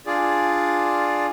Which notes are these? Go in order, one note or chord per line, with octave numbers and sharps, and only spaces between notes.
D4 F4 G#4 D5